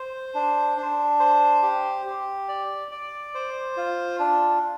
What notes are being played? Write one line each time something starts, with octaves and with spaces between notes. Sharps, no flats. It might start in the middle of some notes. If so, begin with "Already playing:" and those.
Already playing: C5
D4
D4
C5
G4
G4
D5
D5
C5
F4
D4